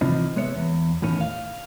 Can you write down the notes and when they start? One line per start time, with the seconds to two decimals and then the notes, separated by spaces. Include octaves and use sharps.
0.01 C3 E3 F3 C4 D#4
0.36 G#3 B3 C#5 E5
0.55 E2
1.02 E2 A2 D#3 C#4
1.21 F5